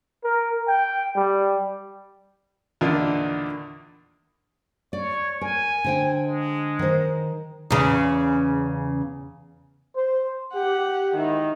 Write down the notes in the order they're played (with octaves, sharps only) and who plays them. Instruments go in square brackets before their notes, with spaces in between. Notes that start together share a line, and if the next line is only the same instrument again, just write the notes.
[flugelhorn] A#4
G5
G3
[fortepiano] E2 A#2 D3 D#3 D4
[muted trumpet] C#5 [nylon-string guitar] D5
[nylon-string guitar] A#4 [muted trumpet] G#5
[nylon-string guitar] D3 C5 G5
[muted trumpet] G#3
[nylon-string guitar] D#3 C5
[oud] E2 C#3
[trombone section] C5
[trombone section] G4 [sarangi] F#5
[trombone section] G#2 E4 [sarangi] D#3